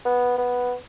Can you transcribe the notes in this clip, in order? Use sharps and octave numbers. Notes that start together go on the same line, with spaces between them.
B3
B3